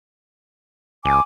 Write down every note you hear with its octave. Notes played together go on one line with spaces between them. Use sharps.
C#2 G#5 D6